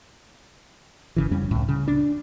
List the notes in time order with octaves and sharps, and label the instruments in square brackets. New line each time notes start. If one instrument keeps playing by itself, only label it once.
[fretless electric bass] G1 C#3 E3
F2 G3 C#4
C#2 A2
C#3
D4